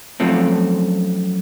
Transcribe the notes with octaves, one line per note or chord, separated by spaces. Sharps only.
F#2 F3 A3 C4